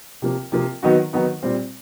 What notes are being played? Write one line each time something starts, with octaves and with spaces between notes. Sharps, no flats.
C3 F3 A#3
C3 F3 A#3
D#3 F#3 B3 D#4 F#4
D#3 F#3 B3 D#4 F#4
A#2 G3 C4